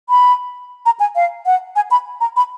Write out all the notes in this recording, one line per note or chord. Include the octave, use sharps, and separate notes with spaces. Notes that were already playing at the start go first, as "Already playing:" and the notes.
B5
A#5
G#5
F5
F#5
G#5
B5
A#5
B5